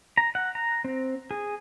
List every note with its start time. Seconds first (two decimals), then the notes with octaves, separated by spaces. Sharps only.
0.17 A#5
0.35 F#5
0.55 A#5
0.84 C4
1.31 G#4